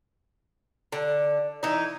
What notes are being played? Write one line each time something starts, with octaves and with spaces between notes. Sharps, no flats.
D3
E3 D#4